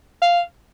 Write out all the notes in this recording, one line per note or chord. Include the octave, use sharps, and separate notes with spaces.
F5